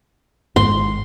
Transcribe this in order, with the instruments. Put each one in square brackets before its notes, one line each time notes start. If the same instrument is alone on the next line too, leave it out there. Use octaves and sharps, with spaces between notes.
[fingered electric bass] G#1 G#2 [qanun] C6